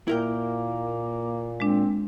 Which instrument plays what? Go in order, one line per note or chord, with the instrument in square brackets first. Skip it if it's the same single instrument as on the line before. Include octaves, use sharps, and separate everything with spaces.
[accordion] A#2 [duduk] A#3 [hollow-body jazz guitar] E4 A#4 G5
[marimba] G#3 D4 [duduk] C4